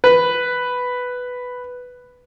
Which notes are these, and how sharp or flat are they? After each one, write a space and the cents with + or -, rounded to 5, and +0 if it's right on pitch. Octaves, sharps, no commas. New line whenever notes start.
B4 +5